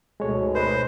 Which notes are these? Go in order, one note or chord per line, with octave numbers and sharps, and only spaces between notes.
D2 G#2 B2 G#3 A4 C#5
B4 C5 D#5